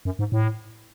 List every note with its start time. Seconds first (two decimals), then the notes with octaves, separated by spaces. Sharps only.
0.05 F#2
0.19 G#2
0.32 A2